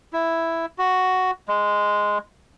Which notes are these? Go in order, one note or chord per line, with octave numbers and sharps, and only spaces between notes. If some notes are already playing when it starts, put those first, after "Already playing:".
E4
F#4
G#3